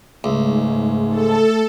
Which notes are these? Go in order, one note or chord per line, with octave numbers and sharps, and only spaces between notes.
C#2 G#2 A3
A4